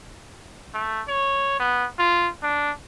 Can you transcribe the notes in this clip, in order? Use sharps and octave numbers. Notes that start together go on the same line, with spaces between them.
A3
C#5
B3
F4
D4